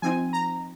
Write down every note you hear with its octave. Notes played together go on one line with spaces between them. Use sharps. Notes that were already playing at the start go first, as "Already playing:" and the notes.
F3 C4 D#4 G#5
A#5